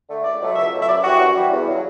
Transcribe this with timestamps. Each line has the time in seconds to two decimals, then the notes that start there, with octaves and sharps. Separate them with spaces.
0.09 D3 A3
0.24 C#2 D5
0.40 B2 F#3 A3
0.56 C#2 E5
0.72 B2 F#3 A3
0.82 E5
0.88 F#2 D5
1.03 E3 G3 F#4
1.19 F#2
1.36 E3 G3
1.51 E2
1.68 C#3 F#3